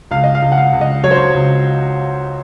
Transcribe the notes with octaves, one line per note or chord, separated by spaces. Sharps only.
C#2 F5
D#5
F5
C#2
F#5
F5
C#2
D#5
F#3 C#5
C5
C#5
C#2